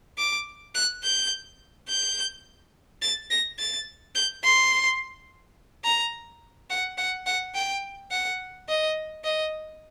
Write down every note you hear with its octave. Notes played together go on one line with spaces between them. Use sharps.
D6
F#6
G6
G6
A6
A#6
A6
G6
C6
A#5
F#5
F#5
F#5
G5
F#5
D#5
D#5